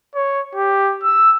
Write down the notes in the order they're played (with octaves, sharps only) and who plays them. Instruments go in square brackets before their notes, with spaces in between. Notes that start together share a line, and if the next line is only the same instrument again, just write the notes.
[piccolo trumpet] C#5
G4
E6